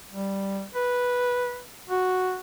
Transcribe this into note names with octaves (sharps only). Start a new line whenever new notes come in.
G3
B4
F#4